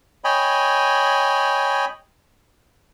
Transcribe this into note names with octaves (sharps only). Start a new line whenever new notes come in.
C#5 D#5 G5 G#5 B5